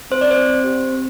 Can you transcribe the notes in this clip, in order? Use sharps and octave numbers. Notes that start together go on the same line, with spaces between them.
C4 C5
D5
C4 C5
C4
G4
C4